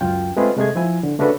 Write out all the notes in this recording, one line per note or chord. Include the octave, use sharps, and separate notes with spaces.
C#2 F#2 F4 G5
G#3 A3 C4 F4 G#4 B4
C3 G#3 A3 G#4 G#6
F3 E4 G#5
D3
C#3 A3 D4 F#4 A4 B4